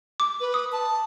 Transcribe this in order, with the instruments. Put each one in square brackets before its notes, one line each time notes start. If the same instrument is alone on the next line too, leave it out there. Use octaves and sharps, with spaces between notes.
[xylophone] D6
[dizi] B4
[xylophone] D#6
[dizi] A5